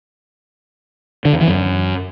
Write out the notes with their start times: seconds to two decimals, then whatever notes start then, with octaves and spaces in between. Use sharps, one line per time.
1.25 D3
1.33 E2
1.40 E3
1.48 F#2